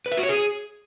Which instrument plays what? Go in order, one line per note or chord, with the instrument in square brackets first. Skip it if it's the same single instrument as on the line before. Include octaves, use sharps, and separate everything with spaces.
[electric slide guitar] B4
E5
F#4
C#5
G#4